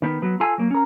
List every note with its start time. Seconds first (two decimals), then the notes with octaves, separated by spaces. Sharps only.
0.02 D#3 B3
0.22 F#3 B3
0.40 F4 A4 G#5
0.58 F#3 A#3
0.71 C#4 A#4